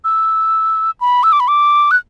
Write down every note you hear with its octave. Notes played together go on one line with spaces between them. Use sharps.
E6
B5
E6
D6
B5
D6
F#6